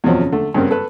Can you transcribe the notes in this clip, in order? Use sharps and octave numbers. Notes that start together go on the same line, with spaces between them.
E2 B2 F3 F#3 C4
C#3
D3 A3
G2 C#3 B3 C4 A#4
A4 B4